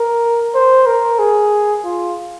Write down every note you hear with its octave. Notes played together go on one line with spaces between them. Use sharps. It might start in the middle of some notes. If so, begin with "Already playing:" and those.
Already playing: A#4
C5
A#4
G#4
F4